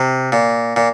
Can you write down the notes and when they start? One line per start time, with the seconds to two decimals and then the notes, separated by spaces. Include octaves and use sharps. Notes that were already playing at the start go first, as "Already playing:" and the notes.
Already playing: C3
0.32 A#2
0.76 A#2